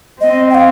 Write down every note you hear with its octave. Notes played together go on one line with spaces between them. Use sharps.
C4 D#5
G5
F5